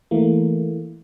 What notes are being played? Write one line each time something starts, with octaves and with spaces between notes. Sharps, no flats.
E3 A3 A#3